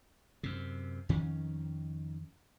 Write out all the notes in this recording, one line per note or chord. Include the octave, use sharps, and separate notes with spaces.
F#2 C3
F2 D#3 C#4